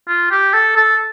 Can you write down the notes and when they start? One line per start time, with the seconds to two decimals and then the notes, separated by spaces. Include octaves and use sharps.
0.08 F4
0.31 G4
0.54 A4
0.76 A4